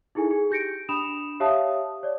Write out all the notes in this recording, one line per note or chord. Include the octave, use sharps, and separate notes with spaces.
D#4 E4 G#4 A4 G#5
G#4
G4 G6 A#6 C#7 D7
D4 B5 D#6 E7 F7
G4 C#5 E5 F5 A5 D#6
C#5 D5